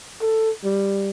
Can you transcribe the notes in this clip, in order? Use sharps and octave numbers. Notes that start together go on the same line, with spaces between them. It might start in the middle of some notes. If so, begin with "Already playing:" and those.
A4
G3